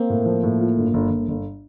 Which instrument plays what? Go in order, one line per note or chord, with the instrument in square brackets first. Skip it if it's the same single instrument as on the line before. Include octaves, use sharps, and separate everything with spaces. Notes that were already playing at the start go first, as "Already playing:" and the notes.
Already playing: [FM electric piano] A#3 [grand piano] C4
[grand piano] A2
F3
A2
F4
G1
G1
G1
G1